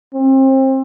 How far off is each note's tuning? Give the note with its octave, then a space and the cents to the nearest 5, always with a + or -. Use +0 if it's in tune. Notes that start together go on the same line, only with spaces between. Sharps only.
C4 +30